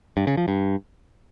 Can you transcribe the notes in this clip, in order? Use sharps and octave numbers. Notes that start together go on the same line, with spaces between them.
G2
C#3
F3
G2